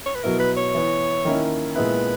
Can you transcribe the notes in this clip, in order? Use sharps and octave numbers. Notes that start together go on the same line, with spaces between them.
C#5
B4
B2 F#3 B3 E4 A#4
B4
C#5
E3 B3 E4
D#3 A#3 C#4 E4
A#2 G#3 B3 E4 B4